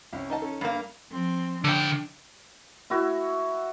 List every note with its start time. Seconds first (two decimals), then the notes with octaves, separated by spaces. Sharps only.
0.13 C2 C#4
0.30 D#3 D#5 A5
0.42 C#4 A4
0.61 G2 A#3
1.12 F3 C4
1.64 D3 D4 G5
2.90 E4 F#4 E5